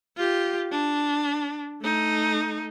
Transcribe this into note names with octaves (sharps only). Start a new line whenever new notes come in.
F4 G4
D4
A3 D#4